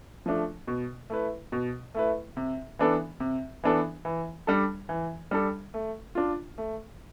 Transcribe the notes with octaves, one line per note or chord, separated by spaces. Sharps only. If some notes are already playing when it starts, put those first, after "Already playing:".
F3 A3 D4
B2
A3 E4 B4
B2
A3 E4 B4
C3
E3 B3 D4 A4
C3
E3 B3 D4 A4
E3
G3 D4 A4
E3
G3 D4 A4
A3
D4 F4
A3